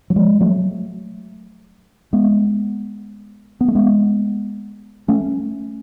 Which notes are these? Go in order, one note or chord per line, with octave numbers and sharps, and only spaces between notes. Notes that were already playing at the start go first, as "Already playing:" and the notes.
F#3
F3 G#3
F#3 A3
G#3 B3
B3
A3
G#3 B3
A3 C#4